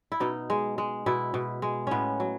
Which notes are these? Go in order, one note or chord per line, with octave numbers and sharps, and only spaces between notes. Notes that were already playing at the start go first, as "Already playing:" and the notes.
E4
B2 D#4
G#3
G#3
B2 E4
B2
G#3
A2 B3 C#4
F#3